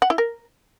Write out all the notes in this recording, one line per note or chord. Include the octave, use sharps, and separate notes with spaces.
F#5
E4
A#4